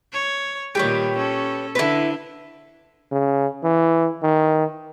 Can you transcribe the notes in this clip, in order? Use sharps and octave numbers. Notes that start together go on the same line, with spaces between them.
C#5
A#2 D#3 G3 G4 B4 C#5
C#4 A4
D3 E4 B4
C#3
E3
D#3